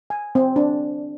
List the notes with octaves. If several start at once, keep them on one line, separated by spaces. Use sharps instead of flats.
G#5
C4
D4